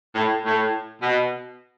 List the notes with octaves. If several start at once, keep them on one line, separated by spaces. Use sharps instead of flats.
A2
A2
B2